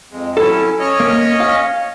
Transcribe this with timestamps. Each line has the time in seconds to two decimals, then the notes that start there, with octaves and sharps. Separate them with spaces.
0.11 F2 G#3
0.37 F#3 C#4 E4 A4
0.79 C#4 C#5 D#5
1.00 A#3
1.40 F5